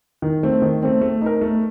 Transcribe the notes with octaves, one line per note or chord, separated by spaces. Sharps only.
D#3
A3 C4
D#3
A3 C4
A3
D#4 A#4
A3